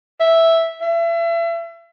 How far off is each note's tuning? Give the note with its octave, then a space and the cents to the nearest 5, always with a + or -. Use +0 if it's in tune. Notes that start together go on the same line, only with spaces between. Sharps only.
E5 +0
E5 +35